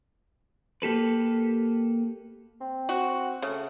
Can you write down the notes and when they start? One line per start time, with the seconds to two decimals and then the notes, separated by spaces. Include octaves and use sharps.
0.82 A#3 G4 A4 B4
2.61 C4
2.89 F#4
3.42 C#3 A3